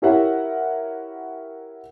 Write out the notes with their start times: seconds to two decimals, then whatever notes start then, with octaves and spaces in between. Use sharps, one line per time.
0.02 E4 G4 A#4 C#5 E5 F#5